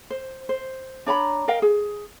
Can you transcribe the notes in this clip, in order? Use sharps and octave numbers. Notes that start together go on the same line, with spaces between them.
C5
C5
D4 C#5 A#5 B5
A#4 D#5 F5 G5
G#4